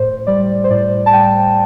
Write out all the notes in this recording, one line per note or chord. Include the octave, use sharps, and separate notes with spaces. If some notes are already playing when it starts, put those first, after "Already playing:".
Already playing: A2 C5
G3 D5
C5
A2 D5
A5
G3 G5